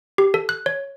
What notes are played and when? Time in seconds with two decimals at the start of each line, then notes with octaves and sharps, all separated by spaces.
0.18 G4
0.34 A4
0.49 F#6
0.66 C#5